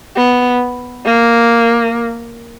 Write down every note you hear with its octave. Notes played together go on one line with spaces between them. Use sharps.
B3
A#3